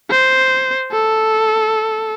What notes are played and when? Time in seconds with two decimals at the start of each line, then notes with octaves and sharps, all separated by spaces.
0.10 C5
0.92 A4